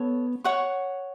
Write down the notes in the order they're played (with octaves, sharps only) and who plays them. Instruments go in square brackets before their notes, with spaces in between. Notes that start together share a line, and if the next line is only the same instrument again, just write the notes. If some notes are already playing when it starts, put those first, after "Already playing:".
Already playing: [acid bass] B3 [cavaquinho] A4 C#5
[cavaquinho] C#5 F#5 C#6